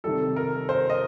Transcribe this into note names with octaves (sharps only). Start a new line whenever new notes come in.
C3 D#3 G3 A4
A#4
C5
D#5